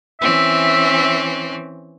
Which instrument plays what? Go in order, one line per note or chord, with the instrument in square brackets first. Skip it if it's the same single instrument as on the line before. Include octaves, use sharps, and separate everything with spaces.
[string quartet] E3 C4 C#4 [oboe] E5